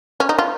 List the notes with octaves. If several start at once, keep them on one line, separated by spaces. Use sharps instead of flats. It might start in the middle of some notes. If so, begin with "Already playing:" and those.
C#4
D#4
F4